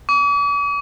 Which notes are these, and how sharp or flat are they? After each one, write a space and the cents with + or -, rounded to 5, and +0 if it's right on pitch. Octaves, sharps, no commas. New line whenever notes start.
D6 -45